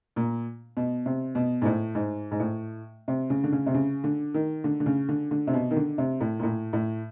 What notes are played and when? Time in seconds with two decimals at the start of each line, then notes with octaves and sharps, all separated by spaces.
0.16 A#2
0.77 B2
1.06 C3
1.35 B2
1.62 G#2
1.65 A2
1.95 G#2
2.31 G#2
2.40 A2
3.08 C3
3.30 C#3
3.44 D3
3.52 C#3
3.66 C3
3.74 C#3
4.04 D3
4.34 D#3
4.64 D3
4.80 D3
4.86 C#3
5.09 D3
5.31 D3
5.47 C3
5.54 B2
5.71 D#3
5.76 D3
5.98 C3
6.21 A2
6.39 A#2
6.43 A2
6.73 A2